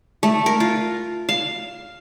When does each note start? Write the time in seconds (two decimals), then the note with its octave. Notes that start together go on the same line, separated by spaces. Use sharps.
0.23 A3
0.46 A#4
0.60 F4
1.29 F5